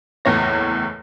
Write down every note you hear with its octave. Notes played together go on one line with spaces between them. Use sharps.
F#1 E2 A2 C#5 A#6